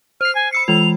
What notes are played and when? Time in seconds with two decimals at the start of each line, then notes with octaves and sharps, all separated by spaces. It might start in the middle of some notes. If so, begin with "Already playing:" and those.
0.21 C5 F6 C7
0.35 G#5
0.53 B5 E6 C7 C#7
0.68 E3 G#3 F4 F7